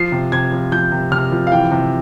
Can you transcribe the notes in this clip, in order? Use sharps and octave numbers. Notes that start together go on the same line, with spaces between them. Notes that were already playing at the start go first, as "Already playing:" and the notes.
Already playing: F3 C7
C3
C3 G#6
F3
F3 G6
C3
C3 F6
F3
F5
E3 G5
C3